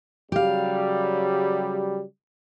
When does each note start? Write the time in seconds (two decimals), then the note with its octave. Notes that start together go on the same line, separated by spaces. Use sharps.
0.32 C#3 F#3 G3 G4 F5